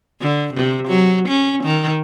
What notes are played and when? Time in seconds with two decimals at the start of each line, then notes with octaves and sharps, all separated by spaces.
0.22 D3
0.54 C3
0.88 F#3
1.28 C#4
1.64 D#3